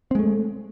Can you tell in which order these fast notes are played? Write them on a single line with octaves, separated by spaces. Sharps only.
C4 G#3 A3